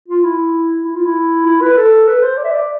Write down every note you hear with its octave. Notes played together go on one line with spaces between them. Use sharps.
F4
E4
E4
F4
E4
E4
B4
A4
B4
C5
D5
E5
D5